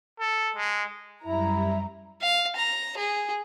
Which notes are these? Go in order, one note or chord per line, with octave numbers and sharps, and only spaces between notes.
A4
G#3
F#2 G3 E4 A#5
F5
A#5
G#4